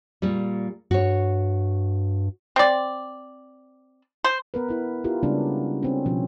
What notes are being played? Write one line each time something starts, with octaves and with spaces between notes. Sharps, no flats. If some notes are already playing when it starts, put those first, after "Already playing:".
A#2 G3
G2 F#4 C#5
C4 D5
C5
B3 A#4 B4
E4 A#4
E4 F4 G4 A#4
C#3 G3 G#3 B3 C#4 D4
C4 C#4
B2 F3 C#4